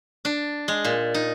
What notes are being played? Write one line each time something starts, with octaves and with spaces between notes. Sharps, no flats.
D4
G#3
A#2
D#4